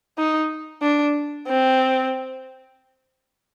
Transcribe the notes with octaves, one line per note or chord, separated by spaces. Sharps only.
D#4
D4
C4